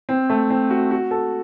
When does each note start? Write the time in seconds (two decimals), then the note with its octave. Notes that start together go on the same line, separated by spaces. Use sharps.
0.09 C4
0.30 A3
0.50 C4
0.70 F#4
0.91 F#4
1.11 A4